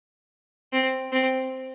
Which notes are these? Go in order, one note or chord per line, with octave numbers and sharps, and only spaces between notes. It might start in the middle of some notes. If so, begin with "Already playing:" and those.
C4
C4